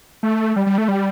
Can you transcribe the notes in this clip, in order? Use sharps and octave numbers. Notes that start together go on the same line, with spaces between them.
A3
G3
G3
A3
G3